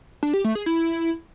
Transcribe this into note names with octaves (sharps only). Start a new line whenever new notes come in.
D4
G4
A3
G#4
E4